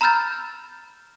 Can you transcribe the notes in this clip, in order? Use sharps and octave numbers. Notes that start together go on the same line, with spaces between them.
A#5 B5 E6 F6 G6 A6